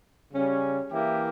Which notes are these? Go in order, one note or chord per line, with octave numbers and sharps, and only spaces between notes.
C#3 G3 C#4
E3 A#3 E4 G4